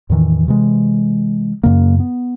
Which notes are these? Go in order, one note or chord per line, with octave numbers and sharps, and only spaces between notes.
E2 A2 D#3 E3
C3 E3 G#3
F#2 C#3 A#3
B3